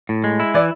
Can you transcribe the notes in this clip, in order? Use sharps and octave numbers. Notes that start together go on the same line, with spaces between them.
A2
G#3
E4
E3 D5